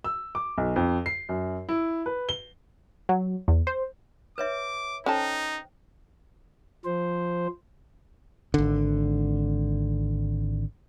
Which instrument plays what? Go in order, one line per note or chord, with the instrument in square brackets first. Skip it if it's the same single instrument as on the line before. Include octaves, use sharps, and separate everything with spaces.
[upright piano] E6
D6
B1
F2
C7
F#2
E4
B4
G7
[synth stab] F#3
E2
C5
[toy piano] B4 C#5 E5 [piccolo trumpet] D6
[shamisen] C#4 A4 A5 [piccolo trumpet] D#4 [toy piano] C5 G5
[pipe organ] F3 C5
[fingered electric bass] G#1 D3